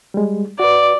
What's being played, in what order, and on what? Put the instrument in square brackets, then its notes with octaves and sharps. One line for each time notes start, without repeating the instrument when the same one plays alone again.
[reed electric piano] G3 G#3
[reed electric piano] F#4 B4 [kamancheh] D5